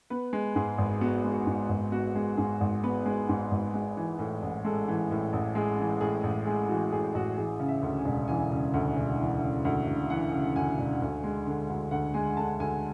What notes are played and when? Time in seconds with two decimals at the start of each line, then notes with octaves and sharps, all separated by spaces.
0.10 B3 B4
0.33 G#3
0.55 G#2 G#4
0.78 G#1
1.01 B3 F#4
1.24 G#3
1.32 F#4
1.46 G#2
1.69 G#1
1.92 B3 F#4
2.15 G#3
2.38 G#2 G#4
2.61 G#1
2.83 B3 B4
3.06 G#3
3.29 G#2
3.51 G#1
3.74 G#3
3.97 E3
4.19 A2
4.42 A1
4.65 G#3 A4
4.88 E3
5.11 A2
5.33 A1
5.55 G#3 G#4
5.79 E3
6.01 A2 G#4
6.24 A1
6.46 G#3 G#4
6.69 E3 F#4
6.92 A2 G#4
7.15 A1 F#4
7.37 E3 G#4
7.60 C#3
7.68 E5
7.82 D2
7.98 G#5
8.05 E1
8.28 E3 G#5
8.52 C#3
8.74 D2
8.97 E1
9.20 E3
9.41 C#3
9.65 D2
9.87 E1
10.10 E3 F#5
10.32 C#3
10.56 D2 G#5
10.78 E1
11.02 D2
11.24 G#3
11.47 D3
11.70 D2
11.91 D2 F#5
12.14 G#3 G#5
12.37 D3 A5
12.60 D2 G#5